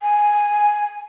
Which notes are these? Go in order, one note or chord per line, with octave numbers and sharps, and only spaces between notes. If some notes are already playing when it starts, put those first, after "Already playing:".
G#5